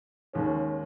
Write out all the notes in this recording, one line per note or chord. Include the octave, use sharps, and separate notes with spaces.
D#2 D#3 G#3 C#4